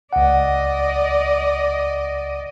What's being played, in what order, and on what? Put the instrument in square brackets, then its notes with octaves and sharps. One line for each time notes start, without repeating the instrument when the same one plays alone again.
[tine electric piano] C#2 F#5 [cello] D5 D#5